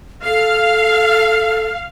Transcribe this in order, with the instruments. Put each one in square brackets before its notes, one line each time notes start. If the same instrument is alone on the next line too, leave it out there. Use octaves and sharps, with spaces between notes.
[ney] A4 [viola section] F5